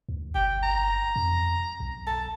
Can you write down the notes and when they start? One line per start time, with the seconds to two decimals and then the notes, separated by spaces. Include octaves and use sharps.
0.09 D2
0.35 G1 G5
0.63 A#5
1.16 F2
1.80 B1
2.07 A5